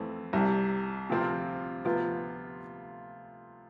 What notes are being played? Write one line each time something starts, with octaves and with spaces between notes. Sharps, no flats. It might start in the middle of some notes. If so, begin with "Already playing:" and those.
Already playing: F2 E3 A3 C4
C2 C3 G3
D2 C3 F3 C4 F4
D2 C3 F3 B3 F4